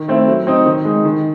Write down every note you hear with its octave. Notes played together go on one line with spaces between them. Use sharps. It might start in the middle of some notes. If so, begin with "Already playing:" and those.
Already playing: D#3
A3 C4 E4
F#3
C4 D#4
D#3
G#3 D#4
D#3